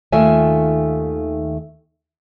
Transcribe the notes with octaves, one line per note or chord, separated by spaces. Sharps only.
D#2 D#3 A3 F4 E5 G#5